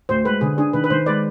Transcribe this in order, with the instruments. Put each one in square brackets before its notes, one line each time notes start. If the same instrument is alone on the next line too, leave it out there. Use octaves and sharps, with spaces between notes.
[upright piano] D2 [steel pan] C5
[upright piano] G#3 [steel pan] B4
[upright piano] D3 [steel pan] G#4
[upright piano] D4 [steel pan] G#4
[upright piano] D#3 [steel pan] B4
[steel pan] B4
[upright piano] D#3 [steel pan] C5
[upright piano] G#3 [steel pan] B4 D5